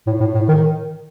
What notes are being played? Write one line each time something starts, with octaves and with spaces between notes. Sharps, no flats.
A2
A2
A2
D#3